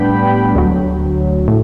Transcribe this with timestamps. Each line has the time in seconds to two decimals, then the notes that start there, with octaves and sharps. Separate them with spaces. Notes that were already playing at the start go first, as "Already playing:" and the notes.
Already playing: A2 G3 B3 D4 G5 B5
0.55 D2 D3 F#3
1.48 A2